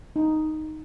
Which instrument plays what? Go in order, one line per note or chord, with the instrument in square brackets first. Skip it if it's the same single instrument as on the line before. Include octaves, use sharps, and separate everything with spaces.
[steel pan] D#4